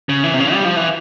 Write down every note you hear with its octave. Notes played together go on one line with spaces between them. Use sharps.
C#3
E3
C3
C#3
G3
F3
E3